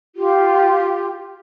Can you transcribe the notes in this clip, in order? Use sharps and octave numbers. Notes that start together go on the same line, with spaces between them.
F4 G4